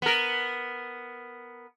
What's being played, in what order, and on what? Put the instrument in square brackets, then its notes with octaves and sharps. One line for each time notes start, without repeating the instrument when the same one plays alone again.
[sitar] B3 A#4